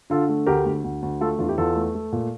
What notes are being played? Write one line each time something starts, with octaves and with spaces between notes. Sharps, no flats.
D3 F4 A4
A3
D2 G4 A#4
D2
D2
D2
A3 F4 A4
E2 D4 F4
E4 G4
E2 F4 A4
A3
A3
A#2